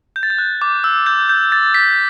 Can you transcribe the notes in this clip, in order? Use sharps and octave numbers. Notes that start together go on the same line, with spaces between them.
G6
A6
G6
F#6
D6
E6
G6
G6
A6
B6